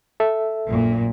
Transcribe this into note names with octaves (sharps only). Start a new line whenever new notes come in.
A4 E5
A#1 F#2 A#2